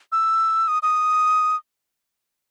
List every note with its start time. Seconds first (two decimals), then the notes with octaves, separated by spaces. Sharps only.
0.12 E6
0.68 D#6
0.83 D#6